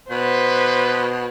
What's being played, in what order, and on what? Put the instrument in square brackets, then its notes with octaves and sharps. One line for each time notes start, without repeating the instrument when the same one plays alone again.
[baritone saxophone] B2 [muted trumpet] B4 [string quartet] C5